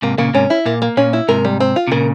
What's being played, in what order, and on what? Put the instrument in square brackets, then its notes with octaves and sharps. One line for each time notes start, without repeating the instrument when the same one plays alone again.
[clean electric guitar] G#2 C3 [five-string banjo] A#3
[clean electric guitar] A#2 C#3 [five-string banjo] A#3
[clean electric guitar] G#2 C3 [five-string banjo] C#4
[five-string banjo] E4
[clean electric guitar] A#2 [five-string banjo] A#3
[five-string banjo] A#3
[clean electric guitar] A#2 [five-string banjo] C#4
[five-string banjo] E4
[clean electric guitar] G#2 C3 [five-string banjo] A#4
[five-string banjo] G3
C4
F4
[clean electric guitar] C3
[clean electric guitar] A#2 C#3 [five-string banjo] A#4